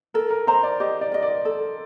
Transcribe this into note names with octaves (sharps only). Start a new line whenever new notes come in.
A4 A#4
A#4
C5 D#5 A#5
D5
G4 D#5
D5
A#4 D#5
D5
A4